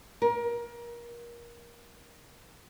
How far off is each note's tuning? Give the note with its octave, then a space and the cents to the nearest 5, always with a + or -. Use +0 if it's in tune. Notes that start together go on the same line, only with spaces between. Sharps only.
A#4 +25